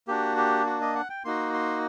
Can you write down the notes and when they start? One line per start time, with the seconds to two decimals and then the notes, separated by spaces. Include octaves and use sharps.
0.08 A#3 D4 F#4 G4
0.37 G4
0.66 F#4
0.81 D#5
0.95 F#5
1.10 G5
1.25 A#3 D#4 F#4 C6
1.53 C6